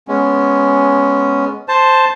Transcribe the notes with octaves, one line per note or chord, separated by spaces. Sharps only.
G#3 B3 C#4
C5 A5